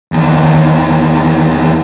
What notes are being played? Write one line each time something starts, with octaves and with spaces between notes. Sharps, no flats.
E2 D#3